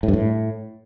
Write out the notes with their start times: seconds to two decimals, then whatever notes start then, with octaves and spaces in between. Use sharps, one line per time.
0.03 A2
0.08 G2
0.13 A2